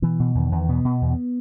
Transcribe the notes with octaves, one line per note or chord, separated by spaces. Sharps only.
B2 E3
B2
E2 D#3
E2
B2 B3
B2
E2